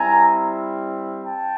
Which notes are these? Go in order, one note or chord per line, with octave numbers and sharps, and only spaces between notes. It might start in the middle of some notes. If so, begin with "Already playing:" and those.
Already playing: G3 C4 E4 G#5 A#5
G5 A5